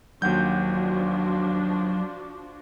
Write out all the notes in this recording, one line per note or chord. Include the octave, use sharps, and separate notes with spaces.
D#2 F3 F#3 D4 F#4 F#5 G6